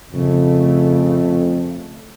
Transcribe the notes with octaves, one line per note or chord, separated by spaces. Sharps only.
F2 C#3 A3